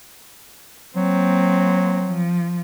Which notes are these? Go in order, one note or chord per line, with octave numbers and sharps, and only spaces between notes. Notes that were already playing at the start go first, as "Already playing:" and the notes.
F#3 A#3 C4
F3